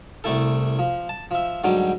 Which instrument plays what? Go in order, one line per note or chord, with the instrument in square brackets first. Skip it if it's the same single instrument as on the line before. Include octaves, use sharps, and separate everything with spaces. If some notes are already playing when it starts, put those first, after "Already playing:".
[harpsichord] C2 C3 A3 E4 A4
F3
A5
F3 E5
G#2 D3 F#3 G3